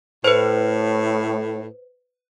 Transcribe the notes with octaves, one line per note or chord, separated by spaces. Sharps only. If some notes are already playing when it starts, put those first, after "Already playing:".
A2 B4 C5